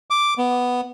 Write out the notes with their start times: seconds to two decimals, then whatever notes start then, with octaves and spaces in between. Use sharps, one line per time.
0.10 D6
0.38 B3